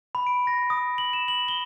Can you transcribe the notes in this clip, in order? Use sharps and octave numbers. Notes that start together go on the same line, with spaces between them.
B5
D7
A#6
D#6
F#7
E7
F#7
G7